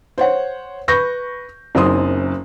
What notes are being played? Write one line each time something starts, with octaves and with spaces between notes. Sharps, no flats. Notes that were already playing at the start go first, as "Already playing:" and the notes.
C5 C#5 F#5
B4 B5 C#6 G6 A#6
F#1 F#2 C4 D#4 C6 D#6